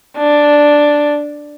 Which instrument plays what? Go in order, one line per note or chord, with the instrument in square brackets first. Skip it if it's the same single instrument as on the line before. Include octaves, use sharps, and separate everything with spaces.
[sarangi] D4